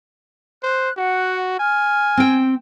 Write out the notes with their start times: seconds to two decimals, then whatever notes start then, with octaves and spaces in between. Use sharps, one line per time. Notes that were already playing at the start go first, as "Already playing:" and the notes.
0.63 C5 F#6
0.97 F#4 F#5
1.59 G#5 F6
2.17 C4 G5